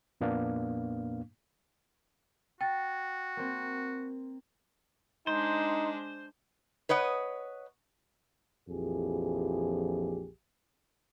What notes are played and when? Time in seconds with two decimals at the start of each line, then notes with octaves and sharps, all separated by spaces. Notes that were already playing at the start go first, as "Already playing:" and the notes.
0.21 F2 A#2 A#3 B3 D4 F5
2.61 F#4 G5 A6
3.37 A#3 C4
5.27 G#3 D4 D#4 C5
6.89 B4 C#5 D#5 F#5
8.70 A#1 F2 E3 G4 G#4